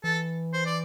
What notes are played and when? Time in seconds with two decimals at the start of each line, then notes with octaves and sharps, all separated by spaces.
0.03 E3 A4
0.53 C5
0.66 D5